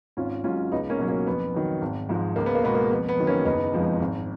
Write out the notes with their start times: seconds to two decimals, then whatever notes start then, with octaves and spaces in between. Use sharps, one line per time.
0.17 G#1 C#4 F4
0.44 G#2 F#3 C#4 F4
0.72 C#2 B3 D#4
0.90 A#3 C#4
0.99 B2 F#3
1.08 A#3 C#4
1.26 F2 B3
1.54 D#3 F#3
1.82 G#1
2.09 G#2 F3 G#3
2.36 C#2 A#3
2.46 B3
2.55 A#3
2.64 B2 G#3 B3
2.75 A#3
2.91 F2 B3
3.09 B3
3.17 D#3 F#3
3.27 A#3 C#4
3.45 F#1 B3 D#4
3.73 F2 F3 G#3
4.00 G#1